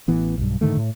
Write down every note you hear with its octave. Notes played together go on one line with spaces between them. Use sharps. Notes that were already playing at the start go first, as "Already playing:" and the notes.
A1 E3 B3
B1 G2
G#2 D3 D#3 A3
A2